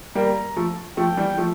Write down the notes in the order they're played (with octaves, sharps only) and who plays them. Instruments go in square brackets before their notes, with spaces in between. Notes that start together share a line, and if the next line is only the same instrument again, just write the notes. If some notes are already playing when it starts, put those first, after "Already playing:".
[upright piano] G3 A#3 [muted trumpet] A#5
[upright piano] F3 A3
[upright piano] F3 A3 [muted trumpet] G5
[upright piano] E3 G3
F3 A3